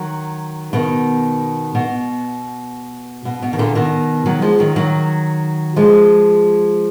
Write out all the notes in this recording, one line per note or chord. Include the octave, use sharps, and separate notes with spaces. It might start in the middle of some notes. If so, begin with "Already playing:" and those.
Already playing: D#3 F#3
B2 D#3
B2
B2
B2
D#3
A#2 D3
B2 D#3
D#3 F#3
F3 G#3
D#3 F#3
D#3 F#3
F3 G#3